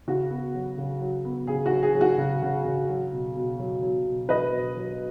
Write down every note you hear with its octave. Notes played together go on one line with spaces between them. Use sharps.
C#3 F#4
B3
F#3
C#3
F#3
B3
C#3 G#4
F#4
F#3
G#4
F#3
F#4
C#3
C#3
C#3
F#3
B2
B2
F#3
F#3
B2
F#3 B4 D#5
B2
F#3